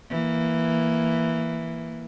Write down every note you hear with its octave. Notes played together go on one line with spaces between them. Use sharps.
E3 A#3